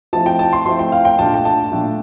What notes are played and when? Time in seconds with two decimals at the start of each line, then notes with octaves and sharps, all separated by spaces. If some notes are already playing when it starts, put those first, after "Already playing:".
0.13 F3 A3 C4 E4 A5
0.26 G5
0.39 A5
0.53 C6
0.66 F3 A3 C4 E4 C6
0.79 G5
0.92 F5
1.05 G5
1.19 A#2 A3 D4 F4 A5
1.34 G5
1.45 A5
1.71 A#2 A3 D4 F4